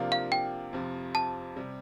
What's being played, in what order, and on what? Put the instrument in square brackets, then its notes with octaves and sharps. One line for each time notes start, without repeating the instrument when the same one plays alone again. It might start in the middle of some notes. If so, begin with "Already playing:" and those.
Already playing: [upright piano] C3 F3 A#3 D4 F4
[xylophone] F5
G5
[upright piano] F2 C3 F3
[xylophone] A5
[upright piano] C3 G3